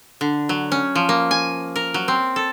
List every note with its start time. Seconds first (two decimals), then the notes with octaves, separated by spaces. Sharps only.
0.21 D3
0.49 F#3
0.72 C#4
0.95 F3
1.09 A#3
1.31 G#5
1.76 A#4
1.94 F#3
2.08 C4
2.36 A4